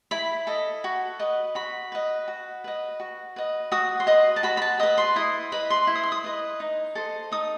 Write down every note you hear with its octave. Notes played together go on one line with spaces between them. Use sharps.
E4 B5
A4 D#5
F#4
B4 D#5
F#4 B5
B4 D#5
F#4
B4 D#5
F#4
B4 D#5
F#4 D#6
C6
B4 D#5 D#6
A5
F#4 B5
B5
A5
B4 D#5 D#6
C6
E4 D#6
B4 D#5 B5
C6
E4
D#6
C6
D#6
B4 D#5
D#4
A4 C5 D#5
D#4 D#6